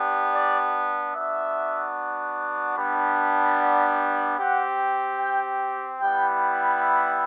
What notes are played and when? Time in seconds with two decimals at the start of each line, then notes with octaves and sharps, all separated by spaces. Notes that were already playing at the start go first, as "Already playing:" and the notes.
Already playing: B3 D4 G4
0.34 D5
1.15 B3 D4 F#4 E5
2.77 G3 B3 D4
3.58 F#5
4.38 C4 G4 F#5
5.19 G5
6.00 G3 B3 E4 G4 G5
6.81 E5